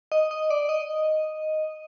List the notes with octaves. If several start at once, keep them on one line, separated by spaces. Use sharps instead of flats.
D#5
D#5
D5
D#5